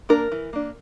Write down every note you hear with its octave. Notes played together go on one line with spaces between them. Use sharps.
A#3 D4 A#4
E3
A#3 D4